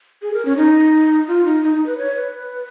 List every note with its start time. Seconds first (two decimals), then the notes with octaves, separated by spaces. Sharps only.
0.22 G#4
0.34 A#4
0.45 C#4
0.57 D#4
1.28 F4
1.45 D#4
1.63 D#4
1.75 D#4
1.86 B4
1.98 C#5
2.16 B4